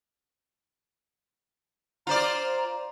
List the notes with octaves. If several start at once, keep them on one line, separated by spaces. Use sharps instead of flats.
F4 C5 D5 A#5